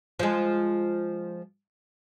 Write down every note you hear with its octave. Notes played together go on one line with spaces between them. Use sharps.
F3 G#3